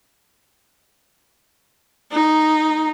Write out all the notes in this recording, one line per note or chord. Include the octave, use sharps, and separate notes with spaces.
D#4